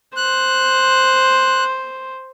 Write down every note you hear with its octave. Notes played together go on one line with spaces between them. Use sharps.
C5 F#6